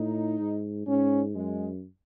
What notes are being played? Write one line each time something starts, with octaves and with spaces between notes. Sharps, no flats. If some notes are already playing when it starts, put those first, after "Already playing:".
Already playing: A2 D#4
G#2
G#2 C#4
F#2 G#3